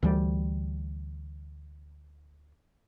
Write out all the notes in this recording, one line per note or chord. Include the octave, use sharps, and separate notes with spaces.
D2 E3 G3